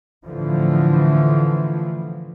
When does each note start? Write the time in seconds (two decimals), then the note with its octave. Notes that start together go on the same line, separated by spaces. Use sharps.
0.25 A2 D3 E3 F3